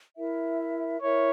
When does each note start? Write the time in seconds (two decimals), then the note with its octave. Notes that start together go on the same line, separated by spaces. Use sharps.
0.18 E4 A#4 E5
1.01 E4 A#4 C#5 E5